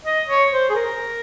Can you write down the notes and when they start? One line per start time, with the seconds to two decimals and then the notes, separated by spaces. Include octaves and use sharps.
0.05 D#5
0.28 C#5
0.51 C5
0.69 G#4
0.75 A#4